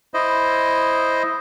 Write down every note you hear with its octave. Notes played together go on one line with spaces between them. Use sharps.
E4 C5 D#5